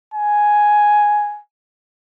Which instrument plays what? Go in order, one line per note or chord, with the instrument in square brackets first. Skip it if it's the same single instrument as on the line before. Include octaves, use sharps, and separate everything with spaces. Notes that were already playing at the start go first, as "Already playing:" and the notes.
[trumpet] G#5